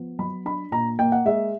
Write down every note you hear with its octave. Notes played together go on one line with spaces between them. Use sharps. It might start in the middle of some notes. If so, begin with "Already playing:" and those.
Already playing: F3 B3
F#3 B5
D4 B5
A#2 A#5
A#3 G5
F#5
G#3 E5